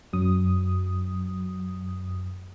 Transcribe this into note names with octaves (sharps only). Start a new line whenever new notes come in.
F#2 F#3 D#6